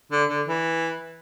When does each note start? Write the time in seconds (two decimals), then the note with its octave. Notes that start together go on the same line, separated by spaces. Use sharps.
0.12 D3
0.29 D3
0.46 E3